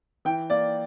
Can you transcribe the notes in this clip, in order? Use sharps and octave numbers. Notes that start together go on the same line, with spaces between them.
E3 G5
A#3 D5